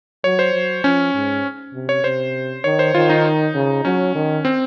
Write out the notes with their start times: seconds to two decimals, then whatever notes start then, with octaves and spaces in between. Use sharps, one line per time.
0.24 F#3 C#5
0.39 C5
0.54 F#3
0.84 F3 C#4
1.14 G#2
1.74 C3
1.89 C#5
2.04 C3 C5
2.64 D#3 C#5
2.79 C5
2.94 D#3 F4
3.09 D#4
3.55 C#3
3.85 F#3 C#4
4.15 D#3
4.45 C4